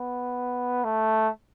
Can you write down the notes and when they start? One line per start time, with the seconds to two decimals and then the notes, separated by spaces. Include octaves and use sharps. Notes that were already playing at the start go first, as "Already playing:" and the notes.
Already playing: B3
0.84 A3